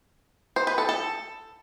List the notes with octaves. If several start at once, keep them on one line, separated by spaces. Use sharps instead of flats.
C5
B4
A4
A4